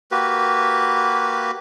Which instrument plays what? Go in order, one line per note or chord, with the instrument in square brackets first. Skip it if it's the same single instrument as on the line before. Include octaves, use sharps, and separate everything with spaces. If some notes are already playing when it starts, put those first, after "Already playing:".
[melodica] A#3 F#4 G4 B4